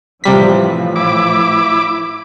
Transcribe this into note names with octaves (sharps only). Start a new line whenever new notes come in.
A2 C3 E3 F3 G3 B6
E4 D6